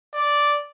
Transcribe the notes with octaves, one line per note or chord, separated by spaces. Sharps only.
D5